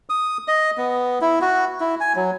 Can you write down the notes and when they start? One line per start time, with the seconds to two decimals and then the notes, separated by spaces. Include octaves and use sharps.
0.10 D#6
0.48 D#5
0.78 B3
1.21 E4
1.42 F#4
1.80 E4
2.00 G#5
2.16 F#3